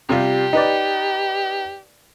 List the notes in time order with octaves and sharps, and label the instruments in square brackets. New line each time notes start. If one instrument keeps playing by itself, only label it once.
[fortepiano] C3 G3 F4 [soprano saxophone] G4
[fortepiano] D#4 B4 D5